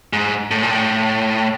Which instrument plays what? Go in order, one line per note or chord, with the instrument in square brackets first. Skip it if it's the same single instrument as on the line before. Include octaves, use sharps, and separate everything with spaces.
[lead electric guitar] G#2
A2
A#2
A2